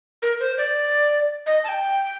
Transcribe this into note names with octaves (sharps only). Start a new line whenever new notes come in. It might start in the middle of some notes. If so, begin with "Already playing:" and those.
A#4
C5
D5
D#5
A5
G5